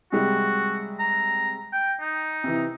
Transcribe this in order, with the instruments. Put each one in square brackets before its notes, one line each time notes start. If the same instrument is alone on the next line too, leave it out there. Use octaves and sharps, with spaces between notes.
[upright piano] C3 G3 G#3 [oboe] F#4
[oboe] A#5
G5
D#4
[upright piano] C3 E3